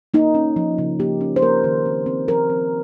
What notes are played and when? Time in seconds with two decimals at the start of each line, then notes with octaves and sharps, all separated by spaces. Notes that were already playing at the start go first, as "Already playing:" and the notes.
0.14 A#3 D#4
0.35 C#4
0.56 F3
0.78 C#3
1.00 A#3 G4
1.21 C#4
1.36 C5
1.42 A#3 A#4
1.64 D#3
1.86 C4
2.06 C4
2.28 F3 A#4
2.50 C4